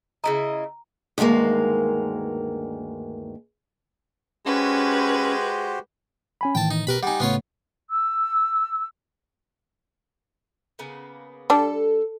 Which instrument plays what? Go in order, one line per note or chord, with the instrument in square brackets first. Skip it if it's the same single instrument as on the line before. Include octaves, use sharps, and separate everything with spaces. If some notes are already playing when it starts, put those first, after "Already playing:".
[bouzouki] C#3 E4 D#5 [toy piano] A#5
[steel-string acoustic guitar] D2 G2 D#3 G#3 A#3
[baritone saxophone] G#3 [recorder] C#4 [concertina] F#4 G4 C5 [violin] B4
[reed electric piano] C#4 G#5 B5
[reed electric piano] A2 D#3 E3 [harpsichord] G5 A5
[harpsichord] D#4
[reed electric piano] B2 G4 [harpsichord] A#4 B4 B5
[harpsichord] G3 D#4 [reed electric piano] F#5 G#5
[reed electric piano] A2 C#3 A3 [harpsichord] B3 F4 C#5
[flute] E6
[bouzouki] C#3 A#3 B3
[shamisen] G3 D4 [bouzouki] A4